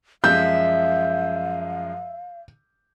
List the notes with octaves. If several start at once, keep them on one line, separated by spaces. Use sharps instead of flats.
F#2 F3 G#3 E5 F5 G6